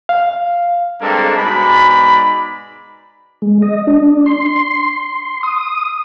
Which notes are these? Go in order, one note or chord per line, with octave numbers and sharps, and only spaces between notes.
F5
G2 G3 G#3 A#3 C4 A4
G#2 B2 D5 B5
G#3
D#5
D4
C6
D#6